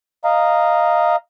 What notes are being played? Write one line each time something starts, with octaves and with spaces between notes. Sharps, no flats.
D#5 F5 A#5